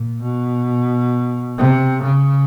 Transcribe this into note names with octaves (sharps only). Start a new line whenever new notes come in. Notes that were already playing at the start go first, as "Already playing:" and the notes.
Already playing: A#2
B2
C3
C#3